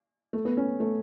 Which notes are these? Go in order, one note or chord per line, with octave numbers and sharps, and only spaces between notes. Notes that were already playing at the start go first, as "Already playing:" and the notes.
A3
B3
C#4
A3